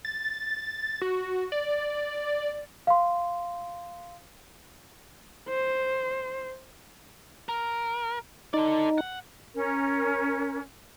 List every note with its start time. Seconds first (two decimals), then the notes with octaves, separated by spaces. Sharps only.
0.05 A6
1.02 F#4
1.52 D5
2.87 F5 C6
5.49 C5
7.49 A#4
8.54 D#4 A4 D5
8.98 F#5
9.55 C#4 A#4